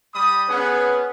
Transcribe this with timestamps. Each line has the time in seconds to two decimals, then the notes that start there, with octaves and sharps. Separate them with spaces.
0.13 G3 B5 D#6
0.48 B3 C#4 G#4 B4 F#5